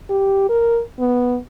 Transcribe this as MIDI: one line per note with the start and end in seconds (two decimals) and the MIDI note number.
0.10 0.47 67
0.49 0.81 70
0.99 1.38 59